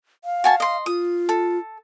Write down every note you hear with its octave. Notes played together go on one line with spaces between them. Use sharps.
F5
F#4 G#5 A5
D#5 C6
F4 D#6
A4